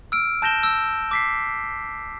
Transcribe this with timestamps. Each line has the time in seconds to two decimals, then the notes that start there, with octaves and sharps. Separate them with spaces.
0.12 E6 F6 D7
0.42 A5 G6 A#6 E7 G7
0.63 E6
1.11 D6 B6 C7